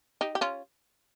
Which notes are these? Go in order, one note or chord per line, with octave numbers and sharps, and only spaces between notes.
D#4 G4
G4
C#4 F4